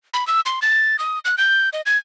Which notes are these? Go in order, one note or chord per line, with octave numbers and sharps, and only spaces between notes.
B5
E6
C6
A6
D#6
F#6
G6
D#5
G#6